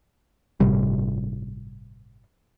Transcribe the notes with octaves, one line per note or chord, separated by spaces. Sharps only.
G1 A2 C3 G3